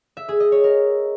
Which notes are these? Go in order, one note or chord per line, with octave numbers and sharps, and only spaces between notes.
E5
G#4
D#5
C#5
A#4